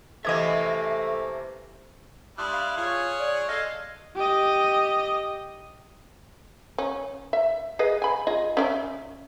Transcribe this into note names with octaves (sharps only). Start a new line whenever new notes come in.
C3 E3 A3 A#3 D#5 E5 D6 G#6
G3 D4 E4 C6 D#6 F#6
F5
C#4 F4 G#4 C#5
D5
A4 D#5 F5 F6 G#6 C7
G4 D#5
C#4
E5
G#4 B4 D#5
G#5 B5
F4 G#4 D#5
C#4 D5 E5